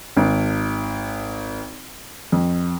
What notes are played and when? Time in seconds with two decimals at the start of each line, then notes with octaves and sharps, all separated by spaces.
0.17 G#1
2.32 F2